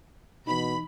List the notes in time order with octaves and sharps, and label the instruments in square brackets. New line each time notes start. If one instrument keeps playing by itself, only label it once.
[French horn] B2 [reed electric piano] E3 D#4 [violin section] B5